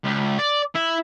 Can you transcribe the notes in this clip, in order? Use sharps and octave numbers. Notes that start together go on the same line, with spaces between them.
C#2
D5
E4